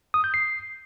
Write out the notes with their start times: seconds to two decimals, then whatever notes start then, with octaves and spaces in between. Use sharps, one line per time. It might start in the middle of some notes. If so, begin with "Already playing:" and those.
0.14 D#6
0.24 G6
0.34 C7